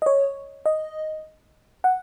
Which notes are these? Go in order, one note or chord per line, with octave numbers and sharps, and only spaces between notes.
D#5
C#5
D#5
F#5